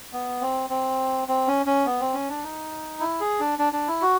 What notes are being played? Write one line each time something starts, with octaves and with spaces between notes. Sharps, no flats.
B3
C4
C4
C4
C#4
C#4
B3
C4
C#4
D4
D#4
E4
G#4
D4
D4
D4
E4
F#4